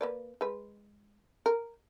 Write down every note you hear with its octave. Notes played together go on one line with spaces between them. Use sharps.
A#3 B4 D5
G#3 B4
A#4